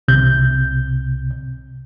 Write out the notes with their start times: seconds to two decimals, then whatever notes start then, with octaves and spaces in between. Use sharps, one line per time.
0.08 C2 C3 G6